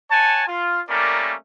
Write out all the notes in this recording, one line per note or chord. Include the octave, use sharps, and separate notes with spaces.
C#5 F#5 G#5 A5
F4
G3 A3 A#3 C#4 A#4 D5